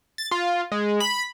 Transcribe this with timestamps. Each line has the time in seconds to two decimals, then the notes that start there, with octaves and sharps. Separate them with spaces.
0.18 A6
0.31 F4
0.72 G#3
1.00 B5